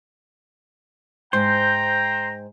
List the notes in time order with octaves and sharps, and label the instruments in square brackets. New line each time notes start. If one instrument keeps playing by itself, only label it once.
[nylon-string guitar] G#2 [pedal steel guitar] C5 [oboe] G5 [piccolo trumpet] A#5